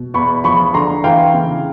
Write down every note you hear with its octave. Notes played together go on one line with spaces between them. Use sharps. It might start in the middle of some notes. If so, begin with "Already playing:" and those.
Already playing: B2
E2 B5 C#6
F3 B5 C#6
D3 A#5 C6
E3 F5 G5
C#3